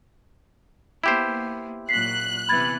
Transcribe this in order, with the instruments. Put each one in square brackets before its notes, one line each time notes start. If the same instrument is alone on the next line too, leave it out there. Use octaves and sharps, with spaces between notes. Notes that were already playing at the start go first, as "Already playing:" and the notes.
[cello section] A#3 B3 [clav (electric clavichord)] E4 G4 C5
[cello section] A#2 F#3 [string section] F#6 [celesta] B6 C7
[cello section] C3 E3 B3 [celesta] B5 G#6 A6